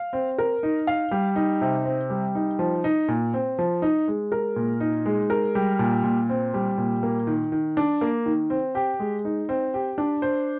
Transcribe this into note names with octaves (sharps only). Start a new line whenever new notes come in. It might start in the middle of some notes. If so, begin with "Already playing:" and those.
Already playing: F5
C4
A#4
D#4
F5
G3
D#4
C3
C4
G3
D#4
F3
D#4
A#2
C4
F3
D#4
G#3
A#4
A#2
D#4
G#3
A#4
G3
A#2
A#2
C4
G3
A#2
A#3
D#3
D#3
D4
A#3
D#3
C4
G4
G#3
D#4
C4
G4
D4
C5